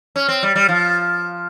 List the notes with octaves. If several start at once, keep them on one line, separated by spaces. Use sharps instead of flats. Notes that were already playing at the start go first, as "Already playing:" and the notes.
C#4
C4
G3
G3
F3